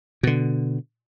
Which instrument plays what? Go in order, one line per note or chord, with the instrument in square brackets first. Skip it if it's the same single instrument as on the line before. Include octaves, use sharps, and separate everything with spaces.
[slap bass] B2 D3